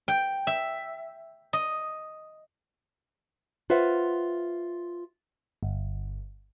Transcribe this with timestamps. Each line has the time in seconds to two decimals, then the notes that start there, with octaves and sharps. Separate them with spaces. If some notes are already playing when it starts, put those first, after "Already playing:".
0.08 G5
0.47 E5
1.53 D#5
3.70 F4 B4 C5 E5 F#5
5.63 G1